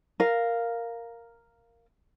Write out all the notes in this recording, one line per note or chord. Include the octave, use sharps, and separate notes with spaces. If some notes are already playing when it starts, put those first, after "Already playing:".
A#4 F5